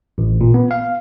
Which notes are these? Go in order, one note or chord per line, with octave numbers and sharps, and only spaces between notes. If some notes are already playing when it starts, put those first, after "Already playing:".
A1
A#2
B3
F5